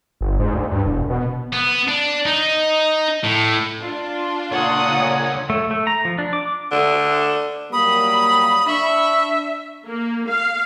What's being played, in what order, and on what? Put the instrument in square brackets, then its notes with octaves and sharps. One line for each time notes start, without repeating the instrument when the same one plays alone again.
[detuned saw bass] G1
G#2
D2
G2
E1
B2
[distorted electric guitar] B3
D4
D#4
A2
[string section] D4 F4
[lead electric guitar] C#2 C#5 [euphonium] A#2 [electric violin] F#5 D#6
[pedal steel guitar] A3
A3
A#5
F3
D4
D6
[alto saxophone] D3
[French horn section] F#3 G3 A#3 [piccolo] B5 [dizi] D#6
[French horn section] D4 [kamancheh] E5 [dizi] C#6
[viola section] A#3
F5